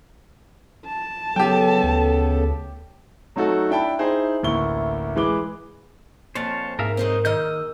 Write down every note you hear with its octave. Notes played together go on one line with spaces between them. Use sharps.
A5
C#3 F#3 B3 G4 A4 G5
D2
F#3 A3 D#4 F#4 A4
D4 E4 G5 A5 B5
D#4 E4 G#4 C5
A1 D2 A#3 E4 C#6 G7
E3 G#3 B4 D6 G7
F2 A#2 C5 C#5 A5
G#2 A#3 G#4 A#4 E5 F5
F#3 G#3 C4 D#4
D#3 D#5 E6 F6 G6